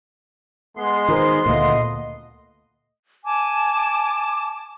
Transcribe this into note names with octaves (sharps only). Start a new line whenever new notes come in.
G#3 B3 C6
D#3 F#4 A#4 C5
D2 A#2 A3 D#5 F5
G#5 A5 D6